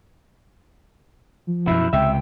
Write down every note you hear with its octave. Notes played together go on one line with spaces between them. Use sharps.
F3
F#2 B2 E4
C#2 C3 E5 G5